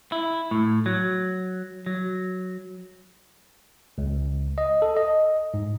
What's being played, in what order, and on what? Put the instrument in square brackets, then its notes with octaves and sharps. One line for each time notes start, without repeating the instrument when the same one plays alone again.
[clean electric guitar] E4
A2
F#3
F#3
[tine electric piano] C#2
D#5
A4
D#5
G#2